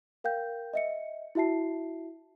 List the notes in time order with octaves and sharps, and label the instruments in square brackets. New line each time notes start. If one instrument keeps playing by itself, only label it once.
[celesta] A#4 F5 G5 G6
D#5 E5 C#7
E4 F#4 E5 A5 C7